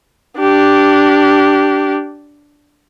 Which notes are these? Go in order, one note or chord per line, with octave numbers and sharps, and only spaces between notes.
D4 G4